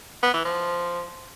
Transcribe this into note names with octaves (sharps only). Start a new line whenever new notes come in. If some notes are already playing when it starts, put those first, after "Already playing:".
B3
E3
F3